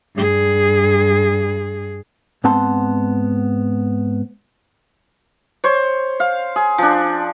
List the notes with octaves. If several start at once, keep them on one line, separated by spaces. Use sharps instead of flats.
G2 G#4
G#2 B3 C4 F#5 A5 C6
C5 C#5
F5
G#4
F3 D4